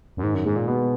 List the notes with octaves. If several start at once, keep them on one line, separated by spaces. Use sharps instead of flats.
F#2
G#2 D#3
F#2
G#2 G#3
A#2
B2 B3